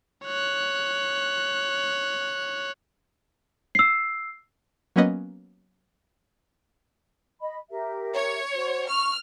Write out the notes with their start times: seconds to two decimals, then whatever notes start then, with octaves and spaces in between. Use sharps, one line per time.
0.25 C#5 F#6
3.75 E6 C7
4.96 F#3 A#3 B3 C#4 B4 D#5
7.41 D#5 B5
7.70 G4 A#4 E5
8.13 C#5
8.55 F#4 C5
8.89 C#6 F6